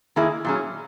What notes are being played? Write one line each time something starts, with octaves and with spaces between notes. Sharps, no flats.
D#3 A#3 E4 G#4
A#2 F#3 C#4 G#4